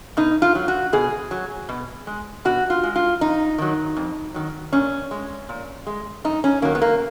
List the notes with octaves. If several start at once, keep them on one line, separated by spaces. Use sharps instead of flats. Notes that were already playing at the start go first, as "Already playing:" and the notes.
B2 D#4
F4
F#3
F#4
B2 G#4
F#3
B2
G#3
B2 F#4
F4
G#3
F4
F2 D#4
D#3 F#3
F2
D#3 F#3
A#2 C#4
G#3
A#2
G#3
F#2 D#4
C#4
D#3 F#3 A#3
B3
A#3